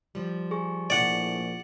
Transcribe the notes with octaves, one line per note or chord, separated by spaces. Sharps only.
F3 G3
G#4 C#6
A#1 A2 D5 F#5